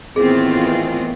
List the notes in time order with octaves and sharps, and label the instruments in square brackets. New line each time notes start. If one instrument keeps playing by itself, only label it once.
[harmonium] A2 D#3 E3 [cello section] B3 C4 F4 [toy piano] G#4